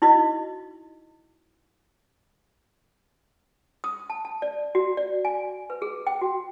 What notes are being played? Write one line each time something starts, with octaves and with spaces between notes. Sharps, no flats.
D#4 E4 F#4 D#5
D#6
A5
A5
D5
F#4
D5
G#5
B4
G#4
G5
F#4